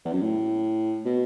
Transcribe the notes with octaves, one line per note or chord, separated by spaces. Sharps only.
E2
F#2
A2
B2